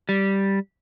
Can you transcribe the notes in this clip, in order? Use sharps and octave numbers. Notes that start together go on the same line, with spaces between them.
G3